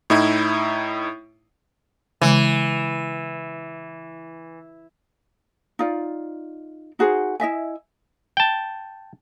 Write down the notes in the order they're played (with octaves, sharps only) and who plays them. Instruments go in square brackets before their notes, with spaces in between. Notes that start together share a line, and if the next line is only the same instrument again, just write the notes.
[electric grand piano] A2 D#4 E4
[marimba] C#3 G#3 [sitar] E3
[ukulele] D#4 F4 D5
D#4 F#4 G#4 C5
E4 D#5 E5 G#5
[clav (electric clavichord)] G5 A5